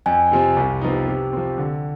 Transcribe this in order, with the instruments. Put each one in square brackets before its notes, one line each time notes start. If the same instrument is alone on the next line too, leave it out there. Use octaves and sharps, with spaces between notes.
[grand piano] F2 [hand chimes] G#5
[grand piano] C3 F3 C4
C2
C3 F3 B3 D#4
C3
F3 C4
D3